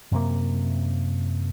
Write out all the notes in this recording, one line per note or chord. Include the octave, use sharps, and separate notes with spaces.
F#2 C3 A#3